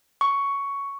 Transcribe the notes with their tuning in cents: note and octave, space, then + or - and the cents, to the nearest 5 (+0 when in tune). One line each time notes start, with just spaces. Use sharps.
C#6 +10